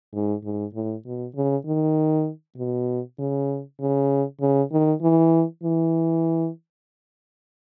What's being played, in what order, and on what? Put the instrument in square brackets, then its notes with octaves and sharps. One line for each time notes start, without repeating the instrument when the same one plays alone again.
[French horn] G#2
G#2
A2
B2
C#3
D#3
B2
C#3
C#3
C#3
D#3
E3
E3